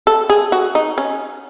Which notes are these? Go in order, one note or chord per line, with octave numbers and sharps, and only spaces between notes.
A4
G#4
F#4
D#4
C#4